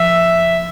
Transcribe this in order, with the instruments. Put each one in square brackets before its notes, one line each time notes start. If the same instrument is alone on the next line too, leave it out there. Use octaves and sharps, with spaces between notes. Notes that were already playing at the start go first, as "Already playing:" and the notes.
Already playing: [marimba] F3 [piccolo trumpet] E5